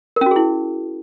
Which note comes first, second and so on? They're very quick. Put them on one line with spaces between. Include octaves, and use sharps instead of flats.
A#4 C#4 F#4 G#4 E4